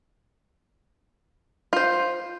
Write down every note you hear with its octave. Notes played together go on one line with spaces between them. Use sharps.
F4 C5